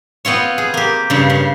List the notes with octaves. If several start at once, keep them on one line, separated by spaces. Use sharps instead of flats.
B3 C4 F4 C#5
G#4
A#3 G4
G2 C#3
C#3